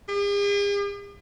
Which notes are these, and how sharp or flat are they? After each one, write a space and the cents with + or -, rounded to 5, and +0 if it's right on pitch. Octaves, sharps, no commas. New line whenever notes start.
G#4 -45